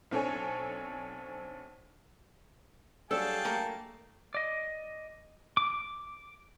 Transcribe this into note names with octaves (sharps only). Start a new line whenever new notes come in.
B1 C4 D4 A4 C#5 G#5
F#3 G3 D4 G#4 A4 F5 G5 A5
A3 A#3 A#5
D5 D#5
D6